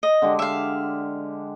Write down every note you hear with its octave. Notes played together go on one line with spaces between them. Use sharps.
D#5
D3 G#3 G4
E5 F5